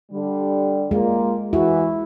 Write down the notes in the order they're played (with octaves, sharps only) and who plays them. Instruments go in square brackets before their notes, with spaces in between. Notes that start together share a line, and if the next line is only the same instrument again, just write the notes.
[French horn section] D3 G3
[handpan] G#3 [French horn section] A#3 F4
[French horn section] E3 F#4 [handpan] E4